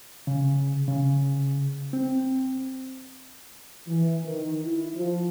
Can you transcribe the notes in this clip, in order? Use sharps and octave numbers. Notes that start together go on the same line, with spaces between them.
C#3
C#3
C4
E3
D#3
E4
F3